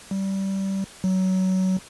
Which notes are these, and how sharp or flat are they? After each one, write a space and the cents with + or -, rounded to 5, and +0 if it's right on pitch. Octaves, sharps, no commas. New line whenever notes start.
G3 -20
F#3 +20